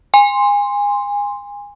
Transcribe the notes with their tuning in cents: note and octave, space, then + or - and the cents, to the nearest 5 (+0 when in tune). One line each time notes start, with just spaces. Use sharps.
G#5 -25 C6 +0